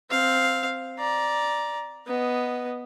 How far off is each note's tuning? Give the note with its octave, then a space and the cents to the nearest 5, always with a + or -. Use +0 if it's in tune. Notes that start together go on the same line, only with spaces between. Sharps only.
C4 +0 F5 +0
D5 +0 A#5 +15
B3 +0 D#5 +0